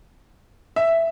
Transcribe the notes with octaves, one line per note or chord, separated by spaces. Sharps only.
E5